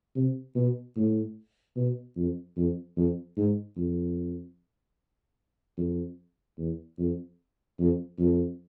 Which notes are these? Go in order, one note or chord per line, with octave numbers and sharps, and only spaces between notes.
C3
B2
A2
B2
F2
F2
F2
G#2
F2
F2
E2
F2
F2
F2